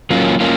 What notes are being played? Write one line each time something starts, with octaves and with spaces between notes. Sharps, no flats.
F#3 A#3 C#4 F4
A#3 C#4 F4